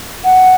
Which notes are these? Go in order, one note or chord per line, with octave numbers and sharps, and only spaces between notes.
F#5